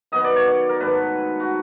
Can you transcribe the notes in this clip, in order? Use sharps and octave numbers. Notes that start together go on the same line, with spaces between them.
D#3 F#3 B3 D#5
D5
C#5
D5
A#4
G#2 D#3 F#3 A3 B4
F#4